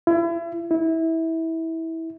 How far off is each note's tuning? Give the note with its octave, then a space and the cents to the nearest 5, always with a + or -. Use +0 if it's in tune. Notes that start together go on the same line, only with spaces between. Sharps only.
E4 +35
E4 -20